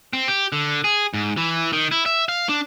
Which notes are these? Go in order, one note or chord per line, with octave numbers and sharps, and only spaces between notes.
C4
G4
D3
G#4
G#2
E3
D#3
E4
E5
F5
D4